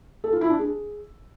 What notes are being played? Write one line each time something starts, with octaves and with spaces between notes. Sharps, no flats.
A4
F4
E4
D4
G#4